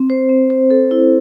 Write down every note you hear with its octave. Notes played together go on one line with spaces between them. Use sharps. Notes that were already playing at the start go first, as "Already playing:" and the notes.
Already playing: C4
C5
C4
C5
A4
E4